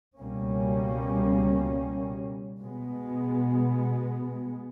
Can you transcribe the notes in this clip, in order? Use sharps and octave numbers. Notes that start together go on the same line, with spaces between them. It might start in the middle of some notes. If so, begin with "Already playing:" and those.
C#2 B2 G3 A#3 C#4
B2 G#3 B3